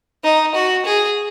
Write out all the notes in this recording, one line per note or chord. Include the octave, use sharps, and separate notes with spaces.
D#4
F#4
G#4